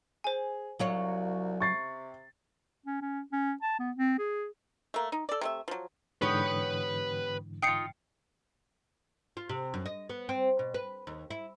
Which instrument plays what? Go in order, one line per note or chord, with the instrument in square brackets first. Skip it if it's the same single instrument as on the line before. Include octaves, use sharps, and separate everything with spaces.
[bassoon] G#4 [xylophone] C5 G#5
[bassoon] C2 [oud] F#3 F4 C#5
[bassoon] C3 [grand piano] C#6 A6 C7
[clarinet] C#4
C#4
C#4
A5
B3
C4
G#4
[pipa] A3 A#3
D#4
A4 D5
C3 A3 E5
F3 F#3
[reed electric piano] G#2 D3 E3 [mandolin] B3 G4 C#5 [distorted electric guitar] B4 B5
[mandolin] D#4 F4 [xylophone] G5 C7 C#7
[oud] F4
C3
F#2
D#5
B3
C4
B2
B4
D#2
E4